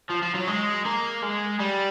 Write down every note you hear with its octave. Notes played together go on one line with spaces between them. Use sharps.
F3
F3
F#3
G#3
A#3
G#3
G3